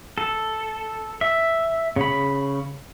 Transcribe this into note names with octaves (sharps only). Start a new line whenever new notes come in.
A4
E5
C#3 B5